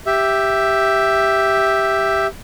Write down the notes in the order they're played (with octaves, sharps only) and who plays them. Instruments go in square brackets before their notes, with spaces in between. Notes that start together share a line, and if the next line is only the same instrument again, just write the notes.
[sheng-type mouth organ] G4 E5